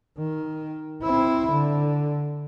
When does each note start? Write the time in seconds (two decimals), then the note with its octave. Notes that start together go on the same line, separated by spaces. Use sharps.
0.18 D#3
1.02 C4 E4
1.52 D3